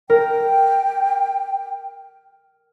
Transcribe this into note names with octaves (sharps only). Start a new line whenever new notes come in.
A#4 G5